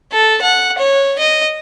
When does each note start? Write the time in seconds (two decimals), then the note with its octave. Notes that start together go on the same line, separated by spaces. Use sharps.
0.12 A4
0.42 F#5
0.78 C#5
1.19 D#5